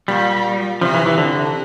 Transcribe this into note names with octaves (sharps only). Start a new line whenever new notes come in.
A#2 G3
C3 F3
E3
E3
D3